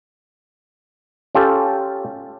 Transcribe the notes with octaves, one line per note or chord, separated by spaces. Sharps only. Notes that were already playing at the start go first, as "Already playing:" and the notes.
C#4 F4 G4 A4